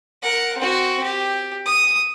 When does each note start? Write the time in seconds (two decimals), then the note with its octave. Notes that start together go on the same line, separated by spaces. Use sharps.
0.22 A#4 F#5
0.57 C4 F#4
1.04 G4
1.65 D#6